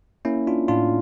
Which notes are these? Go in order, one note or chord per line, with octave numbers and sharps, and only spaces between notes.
A#3 C#4 E4
D4 F4
A2 D4 F4